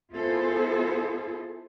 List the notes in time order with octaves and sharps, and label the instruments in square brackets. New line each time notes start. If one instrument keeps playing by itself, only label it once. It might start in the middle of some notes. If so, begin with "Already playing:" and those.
[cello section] B3 E4 F4 G#4 A4 C5